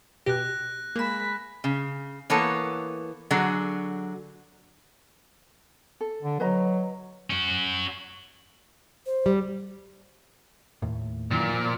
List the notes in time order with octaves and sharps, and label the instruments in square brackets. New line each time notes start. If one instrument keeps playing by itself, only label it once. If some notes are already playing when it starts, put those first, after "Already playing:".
[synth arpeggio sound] B2 G4 [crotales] F#6 A#6
[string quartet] G#3 B5 [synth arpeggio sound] A#3 E7
[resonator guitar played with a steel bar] C#3
E3 A#3 B3 A4 C#5
D3 F#3 F#4 G#4
[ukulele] A4
[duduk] D3
[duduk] F#3 [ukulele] B4 D#5 A#5
[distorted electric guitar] C#4 F#4
[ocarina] C5
[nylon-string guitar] G3
[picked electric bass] D#2 A2
[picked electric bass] F#2 D#3 E3 [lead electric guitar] A#2
[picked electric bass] F3